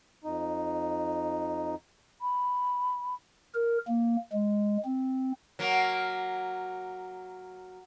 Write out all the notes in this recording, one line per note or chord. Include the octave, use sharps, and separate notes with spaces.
F2 D#4
B5
A#4
A#3
G#3
C4
F#3 A#3